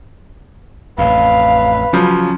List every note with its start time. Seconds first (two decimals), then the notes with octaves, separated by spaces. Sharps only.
0.98 A1 F2 B4 F5
1.93 C#3 F3 F#3 C#4